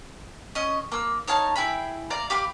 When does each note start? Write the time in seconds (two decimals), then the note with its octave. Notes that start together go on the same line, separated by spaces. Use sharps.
0.55 C#4 D#5
0.92 A#3 E6
1.28 D#4 C#5 F5 A5
1.56 E4 G#4 G5 B5
2.10 D5 F5 A#5
2.30 G4 F5 B5 D6